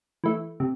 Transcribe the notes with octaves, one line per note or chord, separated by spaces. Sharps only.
E3 A3
C3